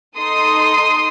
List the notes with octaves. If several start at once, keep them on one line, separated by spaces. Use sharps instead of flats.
D#4 A4 C6 D#6